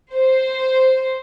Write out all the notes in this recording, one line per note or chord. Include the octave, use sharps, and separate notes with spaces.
C5